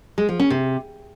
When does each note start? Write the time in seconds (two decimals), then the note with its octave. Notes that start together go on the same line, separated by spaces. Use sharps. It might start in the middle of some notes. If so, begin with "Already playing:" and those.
0.18 G#3
0.29 F3
0.39 C#4
0.50 C3